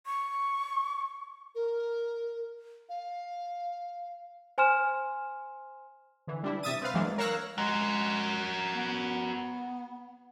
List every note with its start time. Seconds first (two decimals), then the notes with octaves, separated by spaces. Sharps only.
0.07 C#6
1.55 A#4
2.89 F5
4.58 C5 G#5 C6 F6 E7
6.27 D3 E3
6.43 G3 D4 E4
6.63 C3 E5 D#6 A6 D#7
6.81 C4 B4 F5
6.94 E3 F#3 G#3 A#3 D4
7.18 A#4 C#5 F5 E6 F#6 A#6
7.58 G#3 F#4 A#4
8.75 B3